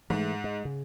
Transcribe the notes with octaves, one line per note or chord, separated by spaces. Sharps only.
G#2 E3 G#3 A3
G#3
C#3